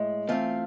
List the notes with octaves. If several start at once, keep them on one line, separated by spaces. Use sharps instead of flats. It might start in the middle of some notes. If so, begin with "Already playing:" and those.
Already playing: A2 G#3
E3 A3 C4 F4 F5